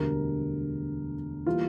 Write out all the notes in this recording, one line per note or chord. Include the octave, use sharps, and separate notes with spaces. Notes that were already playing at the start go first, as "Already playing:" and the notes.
Already playing: E1 D2 D3 G3 A#4
E3 G3 A#3 F4